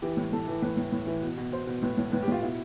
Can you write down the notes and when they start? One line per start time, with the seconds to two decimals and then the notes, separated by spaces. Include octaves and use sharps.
0.02 E3 G4
0.17 A2
0.33 A2 A4
0.48 E3
0.62 A2 B4
0.77 A2
0.92 A2
1.07 E3
1.22 B2
1.37 B2
1.52 B2 C5
1.67 B2
1.82 A2 B4
1.98 A2
2.12 A2 B4
2.23 G4
2.28 A2 F4
2.42 B2 E4